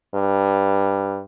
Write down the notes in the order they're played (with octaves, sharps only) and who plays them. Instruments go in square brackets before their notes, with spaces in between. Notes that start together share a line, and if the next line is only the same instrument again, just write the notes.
[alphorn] G2